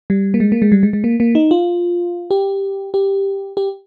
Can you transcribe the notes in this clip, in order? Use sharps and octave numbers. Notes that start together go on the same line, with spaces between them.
G3
A#3
G#3
A#3
G#3
G3
G#3
G#3
A#3
A#3
D#4
F4
G4
G4
G4